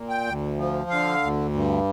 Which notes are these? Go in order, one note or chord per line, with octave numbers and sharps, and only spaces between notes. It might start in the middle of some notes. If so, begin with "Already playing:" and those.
Already playing: A#2
G5
D2
F3
D3 F5
D2
G2